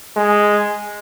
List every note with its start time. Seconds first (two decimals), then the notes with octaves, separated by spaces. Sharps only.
0.17 G#3